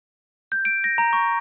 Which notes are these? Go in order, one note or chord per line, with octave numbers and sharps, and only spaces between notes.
G6
D7
A#6
A#5
C#6